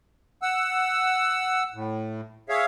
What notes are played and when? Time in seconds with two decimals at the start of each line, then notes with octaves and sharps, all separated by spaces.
0.42 F#5 E6
1.74 A2
2.49 G#4 C#5 E5 F5